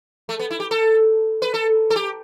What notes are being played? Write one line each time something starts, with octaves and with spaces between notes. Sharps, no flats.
A3
B3
E4
G4
A4
B4
A4
A4
G4